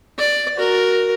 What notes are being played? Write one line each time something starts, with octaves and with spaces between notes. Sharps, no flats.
D5
F#4 A#4